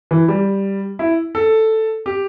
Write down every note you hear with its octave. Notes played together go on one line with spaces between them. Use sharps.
E3
G3
E4
A4
G4